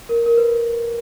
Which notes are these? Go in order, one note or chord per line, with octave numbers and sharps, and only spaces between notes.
A#4
A#4
B4